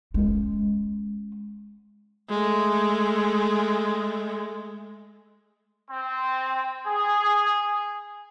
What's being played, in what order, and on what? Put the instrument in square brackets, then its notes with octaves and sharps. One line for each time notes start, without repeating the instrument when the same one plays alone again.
[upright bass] G#3 C#4
[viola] G#3 A3
[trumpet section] C4
G#4